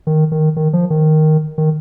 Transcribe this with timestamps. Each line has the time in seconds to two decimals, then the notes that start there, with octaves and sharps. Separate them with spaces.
0.07 D#3
0.32 D#3
0.56 D#3
0.73 F3
0.90 D#3
1.58 D#3